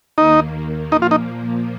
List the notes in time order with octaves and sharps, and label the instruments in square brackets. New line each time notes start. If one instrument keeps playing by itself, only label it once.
[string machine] D#2 D#3 A#3 [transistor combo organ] D#4
[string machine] A#2 F3 A#3 [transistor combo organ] D#4
[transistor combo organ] F4
D#4